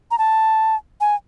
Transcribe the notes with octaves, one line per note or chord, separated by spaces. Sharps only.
A#5
A5
G#5